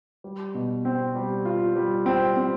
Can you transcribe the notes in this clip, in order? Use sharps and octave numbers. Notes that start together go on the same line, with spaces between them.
G3
B2
C4
G3
F4
G3
C4
C4